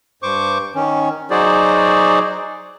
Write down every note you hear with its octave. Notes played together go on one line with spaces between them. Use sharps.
G2 C5 C#6 D6
D#3 C#4
F#3 D#4 F#4 G#4 C5 D5